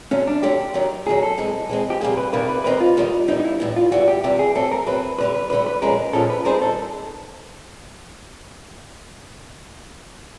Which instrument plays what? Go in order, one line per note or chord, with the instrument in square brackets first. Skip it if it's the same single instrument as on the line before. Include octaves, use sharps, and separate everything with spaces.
[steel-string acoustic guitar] D3 F#3 A3 [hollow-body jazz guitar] C#4
[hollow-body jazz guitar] D4
[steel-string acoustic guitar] D3 F#3 A3 [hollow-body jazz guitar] G4
[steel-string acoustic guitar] D#2 D#3 F#3
[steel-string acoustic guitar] D#2 D#3 F#3 [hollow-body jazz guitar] G#4
[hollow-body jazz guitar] A4
[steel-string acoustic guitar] E3 G#3 C4
E3 G#3 C4
[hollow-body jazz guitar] G4
[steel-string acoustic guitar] F2 C3 D#3 G3 A#3 [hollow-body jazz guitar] G#4
[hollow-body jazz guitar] B4
[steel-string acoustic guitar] F2 C3 D#3 G3 A#3 [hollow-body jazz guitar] B4
[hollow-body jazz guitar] B4
[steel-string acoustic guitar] D#2 D#3 G3 C4 D#4 [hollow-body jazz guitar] B4
[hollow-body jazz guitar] F4
[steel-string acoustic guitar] D#2 D#3 G3 C4 D#4
[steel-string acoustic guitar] A2 E3 G3 B3 [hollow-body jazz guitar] D#4
[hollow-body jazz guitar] D#4
E4
[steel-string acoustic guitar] A2 E3 G3 B3
[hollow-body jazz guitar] F4
[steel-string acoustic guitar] E2 C3 E3 G3 [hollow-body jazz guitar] F#4
[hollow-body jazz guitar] G4
[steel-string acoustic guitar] E2 C3 E3 G3 [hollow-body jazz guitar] G4
[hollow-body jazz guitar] G#4
[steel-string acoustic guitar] F#3 A3 C4 [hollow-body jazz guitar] A4
[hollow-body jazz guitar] A#4
[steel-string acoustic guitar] F#3 A3 C4 [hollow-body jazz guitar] B4
[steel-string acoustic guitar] D2 D3 G3 [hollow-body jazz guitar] B4
[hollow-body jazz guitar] B4
[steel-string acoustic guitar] D2 D3 G3 [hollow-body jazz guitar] B4
[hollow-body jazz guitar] B4
[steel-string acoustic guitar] A#2 F3 G#3 C#4 [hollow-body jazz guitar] A#4
[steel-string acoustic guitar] A#2 F3 G#3 C#4 [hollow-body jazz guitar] A4
[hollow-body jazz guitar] B4
[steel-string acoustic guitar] G3 C4 D#4 G#4 C5 [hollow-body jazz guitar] A#4
[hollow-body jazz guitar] A4